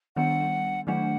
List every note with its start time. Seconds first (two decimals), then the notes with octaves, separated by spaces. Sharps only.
0.16 D#3 G3 B3 D4 F#5
0.87 D#3 F#3 A3 D4 F#5